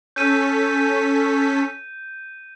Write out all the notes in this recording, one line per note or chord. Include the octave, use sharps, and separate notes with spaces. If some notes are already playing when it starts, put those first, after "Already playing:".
C#4 A4 G6 B6 D#7